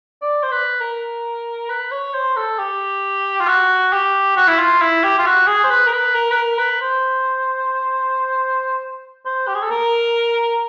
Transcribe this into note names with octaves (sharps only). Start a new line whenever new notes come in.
D5
C5
B4
A#4
B4
C#5
C5
A4
G4
F4
F#4
G4
F#4
E4
F4
E4
G4
F4
F#4
G#4
C5
B4
A#4
B4
A#4
B4
A#4
B4
C5
C5
G4
G#4
A4
A#4